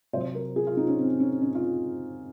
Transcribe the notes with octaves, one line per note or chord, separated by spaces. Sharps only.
C3 F#3 C5
A#4
G#4
F4
D#4
C#4
C4
C#4
C#4
F4